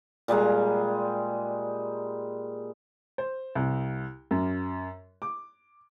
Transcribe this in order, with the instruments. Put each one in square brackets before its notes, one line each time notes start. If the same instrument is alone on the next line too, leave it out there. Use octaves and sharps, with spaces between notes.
[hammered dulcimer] A#2 G3 G#3 A#5
[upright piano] C5
C2
F#2
D6